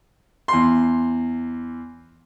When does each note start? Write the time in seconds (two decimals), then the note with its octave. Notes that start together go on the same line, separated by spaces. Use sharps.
0.48 E2 C6